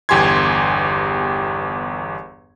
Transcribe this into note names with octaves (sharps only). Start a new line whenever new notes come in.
G1 E2 G4 G#5 C6 G#6